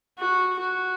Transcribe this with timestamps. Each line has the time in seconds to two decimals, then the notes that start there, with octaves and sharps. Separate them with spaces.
0.19 F#4
0.59 F#4